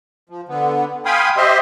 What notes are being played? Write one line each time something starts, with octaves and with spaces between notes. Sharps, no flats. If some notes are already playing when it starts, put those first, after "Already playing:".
F3
D3 B3
F5 G5 G#5 B5 C6 D#6
G4 C5 D#5 E5 C6